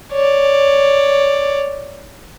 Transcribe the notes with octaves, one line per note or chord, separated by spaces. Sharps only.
C#5 D5